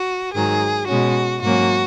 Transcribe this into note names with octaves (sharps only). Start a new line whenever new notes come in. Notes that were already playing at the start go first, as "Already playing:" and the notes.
Already playing: F#4
G#2 D#3 F#3 G#4
B2 G#3 C#4 F#4
G#2 F#3 A#3 C#4 F#4